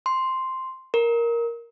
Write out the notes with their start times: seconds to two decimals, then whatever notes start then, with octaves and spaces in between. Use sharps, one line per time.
0.06 C6
0.94 A#4